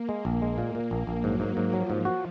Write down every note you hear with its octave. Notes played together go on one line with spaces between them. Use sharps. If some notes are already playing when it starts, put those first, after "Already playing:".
Already playing: A#3
G#3
A#1
G#3
A#2
A#2 A#3
A#1
A#1
G#2 F#3
G#2
G#2
F3 F#3
G#2
F#4